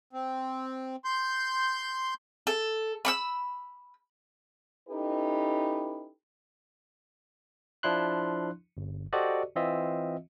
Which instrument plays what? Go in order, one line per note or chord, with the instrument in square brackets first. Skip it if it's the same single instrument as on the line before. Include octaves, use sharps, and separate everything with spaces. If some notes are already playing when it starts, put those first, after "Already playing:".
[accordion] C4
C6 G6
[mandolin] A4
B5 C#6 E6
[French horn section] C#4 D#4 E4 G4 A4 B4
[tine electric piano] F3 D4 E4 C6 F#6
G1
F#4 G4 A4 C5 D5 D#5
E3 C4 F4 D#5 E5